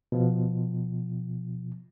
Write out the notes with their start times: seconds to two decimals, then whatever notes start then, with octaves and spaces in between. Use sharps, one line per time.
0.12 B2 F3